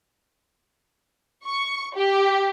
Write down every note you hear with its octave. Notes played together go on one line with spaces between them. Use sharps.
C#6
G4